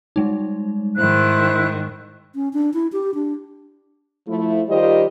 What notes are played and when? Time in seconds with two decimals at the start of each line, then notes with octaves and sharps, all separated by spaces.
0.16 G3 G#3 D#4
0.96 G#2 D#3 E4 C5 F#6
2.35 C#4
2.53 D4
2.74 E4
2.93 G4
3.14 D4
4.28 F3 A3 E4
4.69 D#3 G3 F4 G4 C5 D#5